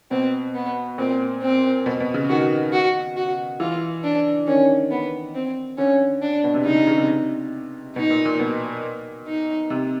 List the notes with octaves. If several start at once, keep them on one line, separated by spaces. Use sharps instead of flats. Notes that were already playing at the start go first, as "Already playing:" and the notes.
B2 C4
B3
A#2 C4
C4
B2
B2
C#3
D#3 F#4
F#4
F#4
E3 F4
D4
D#3 C#4
B3
C4
D3 C#4
D4
B2
C3
C#3 D#4
C3
C#3
C3
B2 D#4
A#2
A#2
B2
D#4
C3